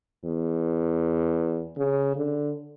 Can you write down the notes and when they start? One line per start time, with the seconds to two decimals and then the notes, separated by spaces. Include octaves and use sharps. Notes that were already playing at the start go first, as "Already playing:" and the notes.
0.25 E2
1.77 C#3
2.17 D3